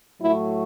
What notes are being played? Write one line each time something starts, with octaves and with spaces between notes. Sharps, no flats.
A2 F#3 A3 E4